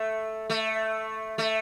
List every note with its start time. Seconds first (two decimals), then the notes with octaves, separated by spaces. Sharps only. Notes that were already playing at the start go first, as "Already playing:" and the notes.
Already playing: A3
0.50 A3
1.38 A3